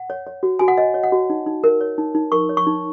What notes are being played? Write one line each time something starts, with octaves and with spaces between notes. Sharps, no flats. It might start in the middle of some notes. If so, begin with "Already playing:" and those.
Already playing: F#5
C#5
C#5
F#4
F#4 G#5
F#5
C#5 D#5
C#5
F#5
F#4
D#4
D#4
A#4
C#5
D#4
D#4
A#4 C#6
C#5
C#6
D#4